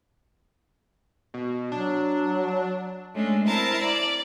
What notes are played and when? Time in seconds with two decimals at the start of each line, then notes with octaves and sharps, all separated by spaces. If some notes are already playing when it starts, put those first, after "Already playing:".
1.34 B2
1.72 F#3 D4
3.15 G#3 A3 C#4 D4
3.45 C4 E4 A#4 A5 A#5
3.82 D5